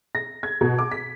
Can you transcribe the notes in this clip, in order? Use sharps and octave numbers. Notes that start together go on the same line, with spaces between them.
A#6
G#6
B2
D6
B6